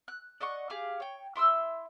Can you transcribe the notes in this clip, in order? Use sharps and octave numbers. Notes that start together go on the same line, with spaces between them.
F#6
D5 D#5 F#5 C#6
G4 G#4 F5 F6
C#5 G5
E4 C6 D6 E6